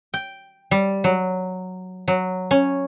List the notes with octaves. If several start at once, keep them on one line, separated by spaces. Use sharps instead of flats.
G5
G3
F#3
F#3
C#4